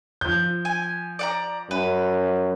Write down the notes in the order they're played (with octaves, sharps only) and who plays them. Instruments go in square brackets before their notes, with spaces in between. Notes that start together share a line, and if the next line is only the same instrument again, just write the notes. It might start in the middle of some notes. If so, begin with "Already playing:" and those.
[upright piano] F3 G6
[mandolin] G#5
D5 F#5 A#5
[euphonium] F#2 [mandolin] B4